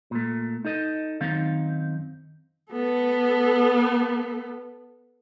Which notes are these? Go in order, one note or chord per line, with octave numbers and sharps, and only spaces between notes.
A#2 A3
D#4 A4 D#5
F#2 D#3 C4 D#4 F5
B3 A4